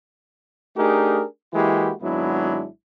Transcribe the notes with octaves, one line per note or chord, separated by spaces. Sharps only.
A3 D4 D#4 G4 G#4 A#4
E3 G#3 A#3 E4 F#4 G4
G#1 F#3 G#3 B3 D4 E4